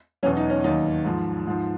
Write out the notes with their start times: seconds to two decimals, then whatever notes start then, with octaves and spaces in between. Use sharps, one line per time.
0.23 E2 B2 F#3 C#4
0.37 D#4
0.50 C#4
0.64 D#2 D#3 F#3 D#4
1.05 G#2 F3
1.47 G#2 F3